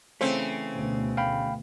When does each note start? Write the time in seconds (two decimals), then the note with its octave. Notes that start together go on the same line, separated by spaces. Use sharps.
0.21 C#3 E3 A3 C4
0.72 D2 B2
1.17 F5 G5 B5